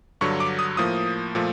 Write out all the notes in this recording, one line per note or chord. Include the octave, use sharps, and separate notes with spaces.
G2 D3 F#3 C#6
D6
D#6
A2 F3 A#3 D#6
A#2 F3 A3